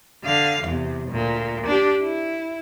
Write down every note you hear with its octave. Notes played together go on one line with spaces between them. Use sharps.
D3 F5
E2 C3
D2 A#2
D4 G4
E4